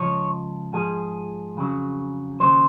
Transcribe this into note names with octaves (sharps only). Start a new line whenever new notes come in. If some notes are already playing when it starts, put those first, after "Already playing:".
Already playing: C#2 F3 C#5
G#2 F3 G#4
F2 C#3 F#3
D#2 C#3 F#3 C5